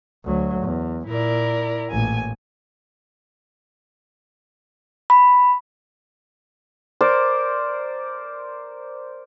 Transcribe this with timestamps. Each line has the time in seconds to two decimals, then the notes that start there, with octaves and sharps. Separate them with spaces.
0.24 D2 F#3
0.62 E2
1.07 A#2 E4 A#4 D5
1.90 A1 A#2 G#5
5.10 B5
7.01 A#4 C5 D5